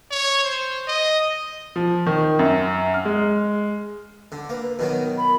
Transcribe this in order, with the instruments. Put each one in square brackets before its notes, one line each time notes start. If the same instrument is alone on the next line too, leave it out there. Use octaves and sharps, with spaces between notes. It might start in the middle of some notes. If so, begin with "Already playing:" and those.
[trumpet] C#5
C5
D#5
[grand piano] F3
D#3
F#2
F6
G#3
[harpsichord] D3
[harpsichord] A#3 [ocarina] B4
[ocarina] B4
[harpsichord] B2 D#3 F#3
[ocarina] B5